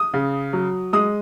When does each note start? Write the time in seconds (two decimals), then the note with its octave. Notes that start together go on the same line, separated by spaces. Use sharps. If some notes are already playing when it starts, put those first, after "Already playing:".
Already playing: D#6
0.14 C#3
0.53 F#3
0.93 G#3 D#6